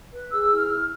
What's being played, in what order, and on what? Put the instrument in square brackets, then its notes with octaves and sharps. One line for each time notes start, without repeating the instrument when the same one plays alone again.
[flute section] B4
G#4 E6
E4
F6
E4